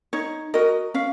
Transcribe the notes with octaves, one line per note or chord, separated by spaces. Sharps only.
D#4 C#5
F#4 A#4 D#5
C#4 F5